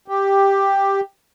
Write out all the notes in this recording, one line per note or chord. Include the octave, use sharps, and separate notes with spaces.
G4